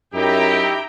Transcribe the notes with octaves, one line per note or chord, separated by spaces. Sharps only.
F#2 D#4 E4 G4 E5 G5 A#5